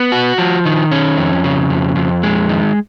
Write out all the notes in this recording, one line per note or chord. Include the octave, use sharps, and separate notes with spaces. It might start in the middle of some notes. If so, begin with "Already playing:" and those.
Already playing: B3
F#4
F3
D#3
C#4
F2
C#3
F2
F2
G#3
D#3